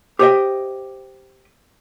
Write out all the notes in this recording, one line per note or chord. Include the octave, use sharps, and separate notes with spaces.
G4 C5 C#5 D#5 E5 G5